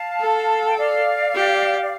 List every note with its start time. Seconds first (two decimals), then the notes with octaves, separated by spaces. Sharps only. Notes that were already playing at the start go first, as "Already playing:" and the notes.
Already playing: F5 A5
0.21 A4
0.65 G5
0.77 D5 F5
1.35 G4
1.81 D5